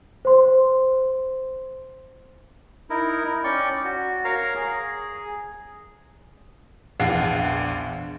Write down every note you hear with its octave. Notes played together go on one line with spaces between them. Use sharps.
C5 C6
D#4 E4 A#4
C#4 D5 G5 C#6
F#4
A#4 C#5 F5 A#5
G#4
A#1 E2 D4 F5 F#5 C7